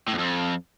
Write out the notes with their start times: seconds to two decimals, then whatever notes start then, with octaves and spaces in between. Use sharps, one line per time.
0.08 A2
0.13 E2
0.18 F2